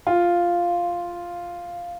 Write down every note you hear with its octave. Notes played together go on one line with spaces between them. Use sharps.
F4